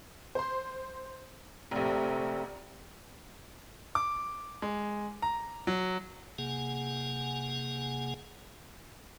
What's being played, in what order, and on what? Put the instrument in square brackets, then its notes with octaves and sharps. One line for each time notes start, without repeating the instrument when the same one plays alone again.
[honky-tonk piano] C5 C6
[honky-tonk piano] F1 A#1 [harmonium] C3 A3 C4
[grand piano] D6
G#3
A#5
F#3
[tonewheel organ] C3 A#3 G#4 F#5 G#5